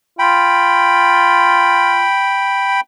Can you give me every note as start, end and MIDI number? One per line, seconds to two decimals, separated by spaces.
0.19 2.06 65
0.19 2.80 79
0.19 2.80 83